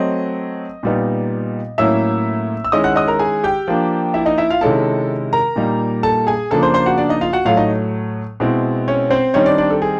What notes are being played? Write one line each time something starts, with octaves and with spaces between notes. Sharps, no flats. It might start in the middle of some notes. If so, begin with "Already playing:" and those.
Already playing: F#3 A3 C4 D#5
A#2 G3 B3 D#4
A2 F#3 A#3 C#4 E4 E5 E6
E6
D#3 G#3 C#4 E4 D#5 D#6
F#5 F#6
D#5 D#6
A#4 A#5
G#4 G#5
G4 G5
F3 A#3 D4
E4 E5
D#4 D#5
E4 E5
F4 F5
C3 D#3 G#3 C#4 E4 A4 A5
A#4 A#5
A#2 G3 A#3 D#4
A4 A5
G#4 G#5
C#3 F3 A#3 D4 A4 A5
C5 C6
C5 C6
F#4 F#5
D4 D5
D#4 D#5
F4 F5
F#4 F#5
A2 F#3 A3 F4 F5
D#4 D#5
B2 G#3 C4 E4
C#4 C#5
C4 C5
D#3 G3 C4 C#4 D#4 C#5
D4 D5
D4 D5
A4
G#4